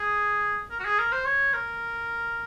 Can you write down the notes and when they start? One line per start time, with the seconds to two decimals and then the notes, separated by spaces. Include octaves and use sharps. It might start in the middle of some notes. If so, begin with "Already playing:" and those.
Already playing: G#4
0.71 A#4
0.80 F#4
0.85 G#4
0.99 A#4
1.12 C5
1.26 C#5
1.54 A#4